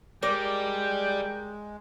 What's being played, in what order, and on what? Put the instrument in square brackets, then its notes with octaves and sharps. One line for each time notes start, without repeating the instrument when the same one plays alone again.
[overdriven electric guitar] G3 [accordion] G#3 [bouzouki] A#4 D5 [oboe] G5